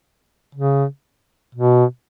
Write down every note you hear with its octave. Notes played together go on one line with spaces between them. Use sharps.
C#3
B2